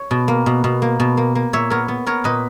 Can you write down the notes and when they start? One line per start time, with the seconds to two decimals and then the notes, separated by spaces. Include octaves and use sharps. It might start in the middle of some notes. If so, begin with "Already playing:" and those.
Already playing: C#5
0.11 B2
0.28 A#3
0.46 B2
0.64 B2
0.82 A#3
1.00 B2
1.17 A#3
1.35 A#3
1.53 A#2 C#5 E5
1.70 B3 A#4 C#5
1.88 B3
2.06 B3 A#4 C#5
2.24 A#2 B4 D#5